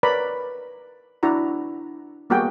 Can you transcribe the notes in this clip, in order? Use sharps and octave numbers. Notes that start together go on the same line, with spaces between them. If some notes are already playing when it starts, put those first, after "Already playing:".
A#4 B4 C#5 D5 A#5 B5
D4 E4 F#4 A#5
G3 A#3 B3 F#4 G#4 G5